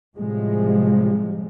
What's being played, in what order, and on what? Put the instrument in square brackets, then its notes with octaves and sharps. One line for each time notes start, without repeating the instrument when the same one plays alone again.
[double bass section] A2 C3 F3 G3 G#3